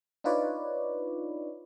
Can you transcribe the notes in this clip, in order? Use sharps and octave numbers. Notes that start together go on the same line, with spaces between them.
D4 D#4 F4 B4 C#5 D5